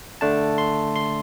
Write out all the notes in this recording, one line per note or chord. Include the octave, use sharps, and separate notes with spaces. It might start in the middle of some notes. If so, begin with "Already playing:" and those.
D3 A3 D4 A5
C6
C6